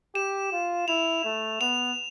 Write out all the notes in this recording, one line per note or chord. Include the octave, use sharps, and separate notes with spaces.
G4 E7
F4
E4 F7
A3
B3 F7